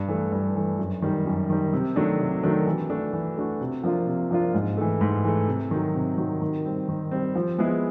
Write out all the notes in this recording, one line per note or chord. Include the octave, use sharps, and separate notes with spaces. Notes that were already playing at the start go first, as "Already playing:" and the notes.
Already playing: G2
E3 A3
G2
E3 A3
F#2
D#3 G3
F#2
D#3 G3
C3
D#3 F#3 A3 D4
C3
D#3 F#3 A3 D4
E3
A3 D4 F#4
E3
A3 D4 F#4
C3
F3 A#3 D4 F4
C3
F3 A#3 D4 F4
G#2
E3 A3
G#2
E3 A3
C3
D#3 F#3
C3
D#3 F#3
D#3
G3 C4
D#3
G3 C4
F3
G#3 B3 E4 G#4